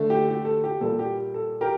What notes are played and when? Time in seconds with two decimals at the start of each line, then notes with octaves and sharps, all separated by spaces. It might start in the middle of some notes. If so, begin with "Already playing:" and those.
Already playing: D3 A3
0.10 G4
0.28 G4
0.45 A4
0.64 G4
0.81 A#2 G3 A#3 A4
0.99 G4
1.34 A4
1.61 G4 A#4